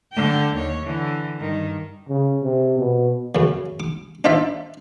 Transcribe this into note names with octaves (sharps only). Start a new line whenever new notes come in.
D3 G5
D#2 C#5
D3 E3
G2 D#3
C#3
C3
B2
F#2 C#3
D6
D4 D#4 F4 C5 D5 E5